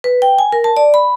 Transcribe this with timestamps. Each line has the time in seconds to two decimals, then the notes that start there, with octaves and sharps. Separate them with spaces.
0.04 B4
0.22 G5
0.39 G#5
0.52 A#4
0.64 A5
0.77 D5
0.94 B5